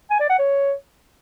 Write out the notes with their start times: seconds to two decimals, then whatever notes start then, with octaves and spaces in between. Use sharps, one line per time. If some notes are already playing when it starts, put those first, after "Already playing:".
0.11 G#5
0.20 D5
0.30 F#5
0.39 C#5